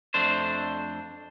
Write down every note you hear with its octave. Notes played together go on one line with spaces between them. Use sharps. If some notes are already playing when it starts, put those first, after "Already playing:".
F2 A3 D4 C5